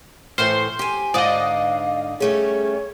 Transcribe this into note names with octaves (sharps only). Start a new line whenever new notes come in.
A2 E3 A4 C5 C6 F6 G6
G4 G#5
G#2 D3 D#4 C5 D5 D#5 F5 D#6
G3 A3 C#4 G#4 C#5